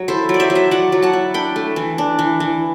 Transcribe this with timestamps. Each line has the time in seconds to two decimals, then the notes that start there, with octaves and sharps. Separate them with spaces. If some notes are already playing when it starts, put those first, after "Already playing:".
Already playing: F#3
0.08 E4 A4 C5
0.29 F#3
0.34 D5
0.40 C5 E5
0.50 F#3
0.55 C5 E5
0.71 F#3 D5 F#5
0.92 F#3
1.02 F#5 A5
1.13 E4
1.34 D4 G5 B5
1.56 A3
1.76 E3
1.98 D4
2.19 E3
2.40 E3